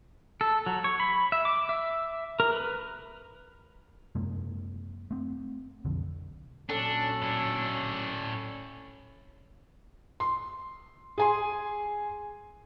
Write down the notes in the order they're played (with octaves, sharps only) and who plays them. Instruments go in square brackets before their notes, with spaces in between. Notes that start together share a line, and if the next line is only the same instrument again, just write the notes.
[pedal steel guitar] A4
F#3
C#5
B5
E5
D6
E5
A#4
B4
[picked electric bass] F#2 C3 G#3 A#3
A3 C4
B1 F2 D3
[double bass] A#2 F#3 [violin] C#4 [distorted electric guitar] D4 [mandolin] A4
[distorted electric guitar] A2 D4
[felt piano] C6
G#4 G#5 C6